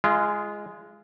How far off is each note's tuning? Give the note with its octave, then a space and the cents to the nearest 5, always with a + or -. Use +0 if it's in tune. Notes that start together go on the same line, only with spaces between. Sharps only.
G#3 +0 F4 -30